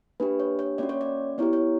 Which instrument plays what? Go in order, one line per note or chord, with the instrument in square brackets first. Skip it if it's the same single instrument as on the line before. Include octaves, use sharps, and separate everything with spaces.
[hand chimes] A#3 D4 G4 B4
C#5
C#5
A#3 C#4 F#4 D5
C#5
D5
B3 E4 G4 C#5
C#5